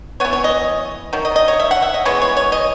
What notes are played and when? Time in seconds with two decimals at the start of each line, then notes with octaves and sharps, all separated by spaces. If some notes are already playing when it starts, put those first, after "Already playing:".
0.20 E3 B3 C#5
0.33 C#5
0.44 D#5
1.13 D#3 F#3
1.25 D#5
1.36 D#5
1.48 C#5
1.60 E5
1.71 F#5
1.82 E5
1.94 D#5
2.05 E3 G#3 B3 C#5
2.22 C#5
2.37 C#5
2.52 D#5